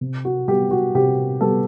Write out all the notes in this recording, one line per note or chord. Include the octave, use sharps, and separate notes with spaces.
C3
F#4
G3 B3 G4
F#4
C3 G4
G3 B3 A4